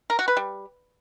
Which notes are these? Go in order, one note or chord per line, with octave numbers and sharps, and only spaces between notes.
A#4
F#4
B4
G3